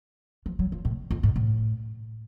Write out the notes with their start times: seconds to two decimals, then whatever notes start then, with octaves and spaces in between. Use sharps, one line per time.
0.46 F3
0.59 F#3
0.72 F3
0.85 A2
1.11 F2
1.23 G#2
1.36 A2